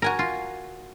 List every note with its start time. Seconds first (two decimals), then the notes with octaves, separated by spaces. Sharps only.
0.02 F#4 A#4 G#5 A#5
0.19 F4